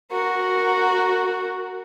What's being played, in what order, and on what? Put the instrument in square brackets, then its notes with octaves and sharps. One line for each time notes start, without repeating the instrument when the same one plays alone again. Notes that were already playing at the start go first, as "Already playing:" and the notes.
[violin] F#4 A#4